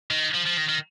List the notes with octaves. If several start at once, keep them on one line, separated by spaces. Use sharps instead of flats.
D#3
F3
F3
D#3
D#3